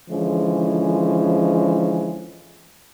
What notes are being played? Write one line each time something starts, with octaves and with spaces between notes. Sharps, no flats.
D3 E3 F3 G#3 C#4